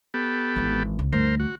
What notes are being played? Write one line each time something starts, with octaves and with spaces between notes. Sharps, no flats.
B3 G4 A4
G#1 E3
C#2
D2 G2 A#4 C5
F#4